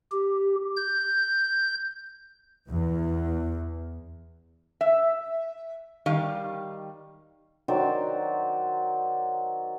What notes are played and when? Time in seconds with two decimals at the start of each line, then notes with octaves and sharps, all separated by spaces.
0.12 G4
0.76 G6
2.71 E2
4.81 E5
6.06 D#3 G3 F5
7.68 D#3 F#3 C5 D5